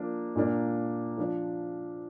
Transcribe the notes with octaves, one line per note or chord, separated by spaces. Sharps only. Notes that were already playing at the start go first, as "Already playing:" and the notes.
Already playing: F3 A#3 D4
A#2 A#3 D4
F3 D4